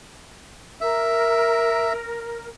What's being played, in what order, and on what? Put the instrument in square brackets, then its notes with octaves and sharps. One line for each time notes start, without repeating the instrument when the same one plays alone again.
[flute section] A#4 [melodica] E5